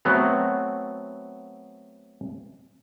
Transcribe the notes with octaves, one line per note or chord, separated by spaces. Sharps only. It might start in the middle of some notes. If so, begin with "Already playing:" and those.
F#3 A3 B3 C4 A#5